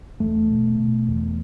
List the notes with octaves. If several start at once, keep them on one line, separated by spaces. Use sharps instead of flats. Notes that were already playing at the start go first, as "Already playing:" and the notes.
E2 A3
B2
B2
E2